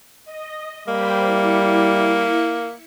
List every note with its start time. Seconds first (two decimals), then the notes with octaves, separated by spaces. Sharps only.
0.25 D#5
0.88 G3 A#3 C5 G5 B5
1.25 E4 C#7